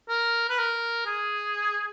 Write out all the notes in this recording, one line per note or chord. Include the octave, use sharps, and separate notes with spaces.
A#4
B4
A#4
G#4